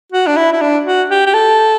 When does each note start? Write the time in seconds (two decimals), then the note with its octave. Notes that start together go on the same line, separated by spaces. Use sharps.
0.12 F#4
0.27 D4
0.36 E4
0.52 E4
0.61 D4
0.85 F#4
1.10 G4
1.26 G4
1.34 A4